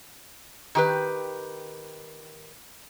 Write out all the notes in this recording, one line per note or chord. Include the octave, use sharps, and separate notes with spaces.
D#3 G4 B4